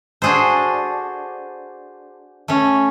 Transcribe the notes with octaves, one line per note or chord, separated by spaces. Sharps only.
D4 F#4 G#4 A4 C5
A3 C#4